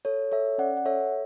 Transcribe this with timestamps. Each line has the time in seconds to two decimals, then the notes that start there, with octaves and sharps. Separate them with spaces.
0.05 A4 C#5
0.32 A4 C#5 E5
0.58 C#4 D5 F#5
0.77 F#5
0.85 A4 C#5 E5